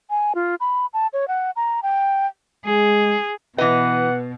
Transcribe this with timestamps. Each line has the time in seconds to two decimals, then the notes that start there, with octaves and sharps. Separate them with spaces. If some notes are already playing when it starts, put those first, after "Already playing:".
0.10 G#5
0.35 F4
0.60 B5
0.93 A5
1.13 C#5
1.28 F#5
1.56 A#5
1.83 G5
2.66 G#3 G#4
3.58 B2 E3 B4 D#5 F#5